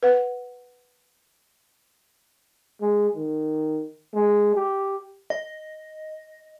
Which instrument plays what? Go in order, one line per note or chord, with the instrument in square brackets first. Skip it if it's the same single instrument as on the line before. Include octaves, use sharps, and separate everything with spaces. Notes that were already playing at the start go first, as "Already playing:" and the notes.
[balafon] B4 F#5
[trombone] G#3
D#3
G#3
G4
[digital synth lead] D#5